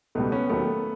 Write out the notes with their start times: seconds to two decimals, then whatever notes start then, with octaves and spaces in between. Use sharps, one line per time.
0.15 C#2 B2 G3 A3 B3
0.32 B3 C#4
0.49 D#2 D#3 F#3 A3 B3